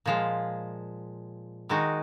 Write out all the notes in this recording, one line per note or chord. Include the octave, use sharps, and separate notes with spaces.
A#2 F3 G#3
D#3 G#3 D#4 F#4